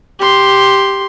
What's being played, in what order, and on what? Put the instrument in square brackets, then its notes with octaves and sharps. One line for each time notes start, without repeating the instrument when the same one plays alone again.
[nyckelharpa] G4 C6